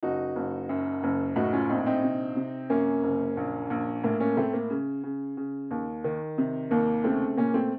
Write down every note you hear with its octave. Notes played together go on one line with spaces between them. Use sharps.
F#1 D#4 F#4
F#1
F#2
F#1
A2 D#4 F#4
C#4 F4
A#1 C4 D#4
C4 D#4
C3
C3
F#2 A#3 C#4
F#1
A#1
A#1
A2 A#3
A#3 C#4
A2 A3 C4
A#3
C#3
C#3
C#3
D#2
D#3
C3
D#2 A#3
C#3 A3 C4
A#2 A#3 C#4
A3 C4